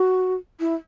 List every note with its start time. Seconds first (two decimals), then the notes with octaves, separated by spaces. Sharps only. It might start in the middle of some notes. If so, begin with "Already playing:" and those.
Already playing: F#4
0.60 E4